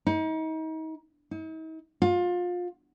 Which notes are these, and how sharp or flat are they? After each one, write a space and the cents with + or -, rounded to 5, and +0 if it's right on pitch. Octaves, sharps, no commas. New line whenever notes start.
D#4 +35
D#4 +45
F4 +25